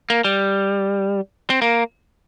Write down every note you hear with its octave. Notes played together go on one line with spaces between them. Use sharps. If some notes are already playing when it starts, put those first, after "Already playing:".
A#3
G3
C4
A#3